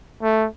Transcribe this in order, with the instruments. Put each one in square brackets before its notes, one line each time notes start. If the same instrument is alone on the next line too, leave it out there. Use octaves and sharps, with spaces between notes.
[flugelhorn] A3